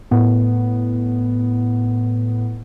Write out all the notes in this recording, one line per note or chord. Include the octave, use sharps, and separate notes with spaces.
A2 B3